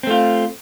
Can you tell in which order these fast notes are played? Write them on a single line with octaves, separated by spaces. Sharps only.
C4 A3 F4